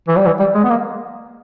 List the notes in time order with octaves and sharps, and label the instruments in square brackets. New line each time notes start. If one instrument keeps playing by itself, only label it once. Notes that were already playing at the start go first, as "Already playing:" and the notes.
[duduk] E3
G3
E3
G3
G#3
B3
A#3